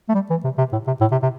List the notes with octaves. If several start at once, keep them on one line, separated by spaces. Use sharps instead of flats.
A3
G3
E3
C3
C3
A2
C3
A2
C3
C3